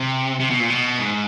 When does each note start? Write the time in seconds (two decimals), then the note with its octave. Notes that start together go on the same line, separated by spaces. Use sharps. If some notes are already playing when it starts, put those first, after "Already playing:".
Already playing: C3
0.40 C3
0.50 B2
0.60 A#2
0.70 B2
0.99 G#2